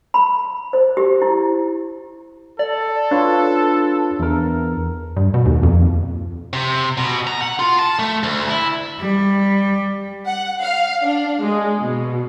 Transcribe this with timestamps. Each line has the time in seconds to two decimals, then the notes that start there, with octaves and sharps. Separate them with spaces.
0.14 B5
0.73 C5
0.97 G4
1.22 E4
2.59 A4 D5
3.11 D4 F4 B4 C#5
4.19 E2 A#4
5.16 G2
5.34 B2
5.46 D#2
5.63 F2
6.53 C3
6.97 B2
7.27 A#5
7.41 F#5
7.59 F4
7.79 A5
7.99 A3
8.23 D2
8.50 E4
9.00 G3
10.26 F#5
10.62 F5
11.03 D4
11.42 G#3
11.80 B2